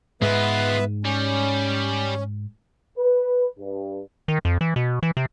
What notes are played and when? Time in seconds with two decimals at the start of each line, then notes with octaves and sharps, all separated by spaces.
0.22 G#2 G#3 B3 F4 B4 E5
1.05 G3 C#4
2.97 B4
3.56 G2
4.28 D#3
4.45 F2
4.61 E3
4.76 B2
5.03 E3
5.17 C3